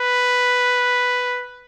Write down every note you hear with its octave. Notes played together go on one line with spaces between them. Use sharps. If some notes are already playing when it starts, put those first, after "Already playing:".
Already playing: B4